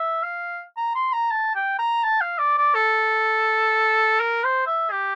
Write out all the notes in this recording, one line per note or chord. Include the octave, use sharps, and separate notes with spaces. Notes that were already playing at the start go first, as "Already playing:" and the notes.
Already playing: E5
F5
A#5
C6
A#5
A5
G5
A#5
A5
F5
D5
D5
A4
A#4
C5
E5
G4